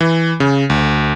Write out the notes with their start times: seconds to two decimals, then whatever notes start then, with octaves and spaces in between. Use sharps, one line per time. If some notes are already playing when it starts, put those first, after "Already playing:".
0.01 E3
0.40 C#3
0.70 D2